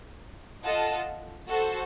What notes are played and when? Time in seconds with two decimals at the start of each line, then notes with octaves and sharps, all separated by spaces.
0.63 F4 A4 D#5 F#5 A5
1.48 F#4 A4 C5